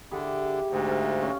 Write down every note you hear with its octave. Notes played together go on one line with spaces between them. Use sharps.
D3 E4 G4 G#4
D2 G#2
A4 F5
C#4